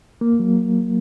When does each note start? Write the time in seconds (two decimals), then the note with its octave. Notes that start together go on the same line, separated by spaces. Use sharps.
0.21 A#3
0.39 F#3